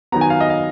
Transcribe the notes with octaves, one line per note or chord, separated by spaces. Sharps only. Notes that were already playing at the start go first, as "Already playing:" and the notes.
D#3 F#3 B3 A#5
G#5
F5
D#5
F5